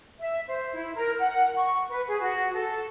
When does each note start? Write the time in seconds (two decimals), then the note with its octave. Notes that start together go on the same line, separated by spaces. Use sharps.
0.19 E5
0.47 C5
0.75 E4
0.94 A#4
1.19 F#5
1.56 C#6
1.90 B4
2.08 G#4
2.20 F#4
2.55 A4